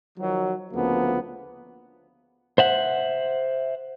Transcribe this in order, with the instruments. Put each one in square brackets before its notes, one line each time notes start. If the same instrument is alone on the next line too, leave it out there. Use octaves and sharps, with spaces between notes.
[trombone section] D#3 F3 F#3
D2 C#3 F3 A#3 B3
[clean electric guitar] C5 E5 F#5